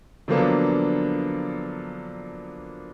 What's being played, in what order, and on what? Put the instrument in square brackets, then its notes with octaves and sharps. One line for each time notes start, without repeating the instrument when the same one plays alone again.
[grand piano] D3 F3 F#3 A#3 B3 D4